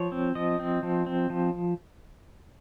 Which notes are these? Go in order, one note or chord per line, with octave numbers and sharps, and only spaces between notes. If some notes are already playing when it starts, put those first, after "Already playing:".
Already playing: F3 C#5
C4
F3 D#5
C4
F3
C4
F3